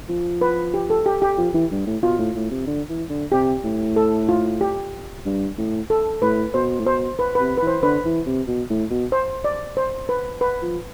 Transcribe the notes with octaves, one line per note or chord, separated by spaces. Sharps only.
F3
B4
G4
A4
G4
G4
F3
E3
G2
A2
B2 F4
A2
A2
C3
D3
E3
D3
C3 G4
A2
A4
F4
G4
G2
A2
A4
A2 B4
B2 C5
A2
B2 C5
B4
C3 B4
B4
E3 C5
D3 B4
E3
C3
B2
A2
B2
C5
D5
C5
B4
B4
F3